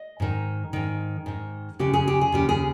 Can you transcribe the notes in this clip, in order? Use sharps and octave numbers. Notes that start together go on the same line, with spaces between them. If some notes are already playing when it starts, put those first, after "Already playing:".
Already playing: D#5
G#2 D#3
G#2 D#3
G#2 D#3
D#2 C#3 G4
G#4
G4
G#4
D#2 C#3 G4
G#4